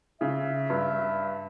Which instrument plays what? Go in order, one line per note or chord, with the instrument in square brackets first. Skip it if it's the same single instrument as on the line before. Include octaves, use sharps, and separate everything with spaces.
[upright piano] C#3 [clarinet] E5
[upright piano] G2